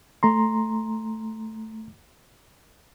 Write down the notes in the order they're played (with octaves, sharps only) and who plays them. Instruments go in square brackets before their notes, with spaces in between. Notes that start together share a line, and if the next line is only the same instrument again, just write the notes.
[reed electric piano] A3 A#5 C6